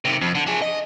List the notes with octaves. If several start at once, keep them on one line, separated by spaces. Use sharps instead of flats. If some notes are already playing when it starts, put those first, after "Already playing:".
C3 D#3
F2
D3
D4 G#4
D#5